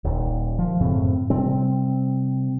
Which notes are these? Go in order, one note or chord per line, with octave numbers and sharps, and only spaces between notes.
D#1 D#2
F3
F#2 A2 C#3 C4
C3 G3 C4